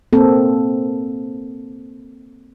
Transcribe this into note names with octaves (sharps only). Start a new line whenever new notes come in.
A#3 C4 A4